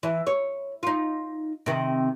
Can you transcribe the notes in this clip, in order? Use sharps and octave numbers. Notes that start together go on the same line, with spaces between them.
E3
C#5
D#4 F4
C3 D#3